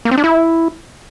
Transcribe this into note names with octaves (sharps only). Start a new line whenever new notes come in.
A#3
C4
D4
E4